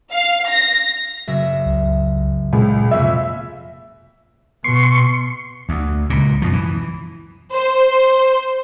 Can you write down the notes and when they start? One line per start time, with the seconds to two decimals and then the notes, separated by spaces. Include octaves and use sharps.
0.12 F5
0.48 A#6
1.27 F#1 E5
1.66 C#2
2.53 C#2 A#2
2.91 F2 C3 A#3 E5
4.64 B2 C6 C#6
5.69 D2
6.10 C#2 A#2
6.42 F#2 B2 F3
6.53 E3
7.54 C5